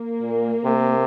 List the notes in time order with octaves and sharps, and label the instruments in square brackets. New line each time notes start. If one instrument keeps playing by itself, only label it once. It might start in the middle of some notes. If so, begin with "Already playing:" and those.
Already playing: [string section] A#3
[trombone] A#2
C3